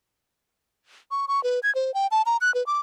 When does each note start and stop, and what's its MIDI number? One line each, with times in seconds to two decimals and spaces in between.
1.11 1.26 85
1.28 1.43 85
1.44 1.60 71
1.63 1.73 92
1.75 1.94 72
1.94 2.07 79
2.11 2.22 81
2.26 2.37 82
2.41 2.53 90
2.54 2.65 71
2.66 2.80 86